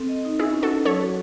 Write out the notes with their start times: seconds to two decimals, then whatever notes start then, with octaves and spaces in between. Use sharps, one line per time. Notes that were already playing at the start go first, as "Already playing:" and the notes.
Already playing: C4 A4
0.09 D#5
0.25 D#4
0.39 C#4 E4 G#4
0.54 C#4
0.62 F#4 A4
0.70 E4
0.85 F#3 A4 C#5
1.01 F#4